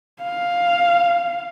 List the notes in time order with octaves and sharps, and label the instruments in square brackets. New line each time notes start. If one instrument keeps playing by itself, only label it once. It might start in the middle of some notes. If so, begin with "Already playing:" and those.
[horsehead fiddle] F5